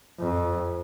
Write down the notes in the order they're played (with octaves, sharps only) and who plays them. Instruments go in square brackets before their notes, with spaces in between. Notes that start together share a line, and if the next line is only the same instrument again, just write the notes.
[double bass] F2